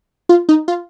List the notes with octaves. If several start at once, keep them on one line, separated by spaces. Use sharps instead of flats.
F4
D#4
F4